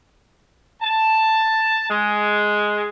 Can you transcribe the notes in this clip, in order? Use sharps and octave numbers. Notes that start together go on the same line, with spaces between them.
A5
G#3